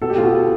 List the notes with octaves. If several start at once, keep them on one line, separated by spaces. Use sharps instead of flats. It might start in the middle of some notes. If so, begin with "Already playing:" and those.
B2 A4
G4
F4
B2 G4